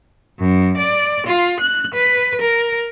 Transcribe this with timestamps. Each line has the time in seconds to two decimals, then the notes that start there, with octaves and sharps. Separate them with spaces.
0.39 F#2
0.77 D5
1.27 F4
1.60 F#6
1.94 B4
2.42 A#4